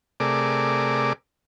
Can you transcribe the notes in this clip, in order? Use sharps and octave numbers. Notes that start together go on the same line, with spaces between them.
C3 A3 G#4 A#4 D5 D6